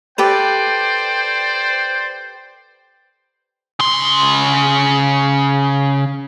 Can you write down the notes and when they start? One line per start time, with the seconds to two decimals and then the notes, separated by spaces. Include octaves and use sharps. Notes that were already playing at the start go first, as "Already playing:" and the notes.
0.18 G4 A4 B4 C5 D5 G5
3.80 C#3 C6